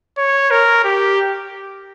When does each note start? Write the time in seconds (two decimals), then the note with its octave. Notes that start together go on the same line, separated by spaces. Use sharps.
0.17 C#5
0.51 A#4
0.84 G4